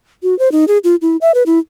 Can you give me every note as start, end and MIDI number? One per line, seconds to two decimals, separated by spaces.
0.23 0.37 66
0.39 0.51 72
0.52 0.65 63
0.68 0.78 68
0.84 0.96 65
1.02 1.17 64
1.21 1.32 76
1.35 1.43 71
1.46 1.59 64